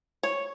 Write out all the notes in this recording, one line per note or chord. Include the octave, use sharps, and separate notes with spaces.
C#5